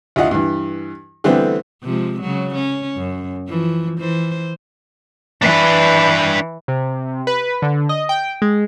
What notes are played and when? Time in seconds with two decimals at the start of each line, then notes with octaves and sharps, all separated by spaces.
0.16 D2 E4 F4 D#5 F#5
0.31 G2 E3
1.24 D3 E3 G3 A3 B3 C4
1.83 C3 F3 G#3
2.21 C#3 F#3
2.55 C#4
2.97 F#2
3.48 E3 F3
3.99 E3 C5
5.42 E3 D4 B4
6.68 C3
7.27 B4
7.62 D3
7.89 D#5
8.09 G5
8.42 G#3